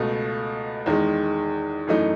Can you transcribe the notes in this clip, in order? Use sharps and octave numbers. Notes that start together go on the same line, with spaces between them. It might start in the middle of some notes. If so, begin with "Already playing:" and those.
Already playing: C#2 B2 A3
E2 D#3 G#3
F#2 E3 A3 D#4